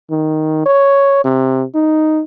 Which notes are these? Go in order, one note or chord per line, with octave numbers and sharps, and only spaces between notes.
D#3
C#5
C3
D#4